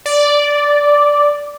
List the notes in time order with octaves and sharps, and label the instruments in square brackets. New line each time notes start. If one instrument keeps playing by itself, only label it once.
[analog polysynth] D5